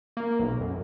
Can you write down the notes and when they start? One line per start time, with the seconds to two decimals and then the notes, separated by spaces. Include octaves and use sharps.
0.17 A#3
0.39 B1
0.61 F#2